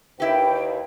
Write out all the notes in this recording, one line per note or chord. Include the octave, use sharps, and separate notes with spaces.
D#2 E4 G4 B4 G5